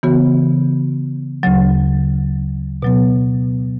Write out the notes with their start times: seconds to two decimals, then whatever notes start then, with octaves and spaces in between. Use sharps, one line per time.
0.03 C#3 E3 B3 F#4
1.43 D2 C#3 F#3
2.82 B2 F#3 B3